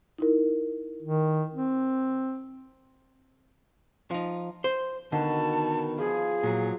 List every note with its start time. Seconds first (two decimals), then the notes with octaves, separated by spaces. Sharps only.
0.19 D#4 E4 A#4
1.02 D#3
1.54 C4
4.11 F3 D#4
4.64 C5
5.12 B2 D3 D#3 A5
5.98 F3 G#4
6.43 A#2 F#3